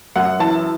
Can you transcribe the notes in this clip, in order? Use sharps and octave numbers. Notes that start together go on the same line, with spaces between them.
F#2 F#5
E3 A5